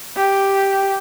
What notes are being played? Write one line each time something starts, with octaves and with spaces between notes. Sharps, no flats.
G4